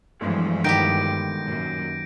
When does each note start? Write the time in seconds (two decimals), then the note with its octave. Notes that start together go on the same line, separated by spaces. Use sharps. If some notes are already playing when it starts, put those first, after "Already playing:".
0.21 G2 B2 E3 F3 G#3 A3
0.64 D#3 B3 G4 G6 A#6 D7
1.44 F#2 A#2